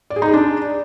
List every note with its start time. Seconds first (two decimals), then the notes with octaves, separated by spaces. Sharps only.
0.10 D5
0.16 G#4
0.22 D#4
0.28 G#4
0.33 D4